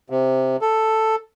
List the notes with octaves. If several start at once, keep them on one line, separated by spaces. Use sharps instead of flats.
C3
A4